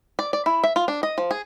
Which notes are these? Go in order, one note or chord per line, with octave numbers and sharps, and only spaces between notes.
D5
D5
E4
E5
F4
D4
D#5
F3
G#4